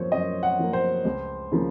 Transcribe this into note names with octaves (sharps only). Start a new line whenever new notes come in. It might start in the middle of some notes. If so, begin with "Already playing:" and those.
Already playing: F#2 F3 A#3 C5 C#5
F#2 D#5
F#5
F3 A#3
C5
C#2
C#3 F3 A#3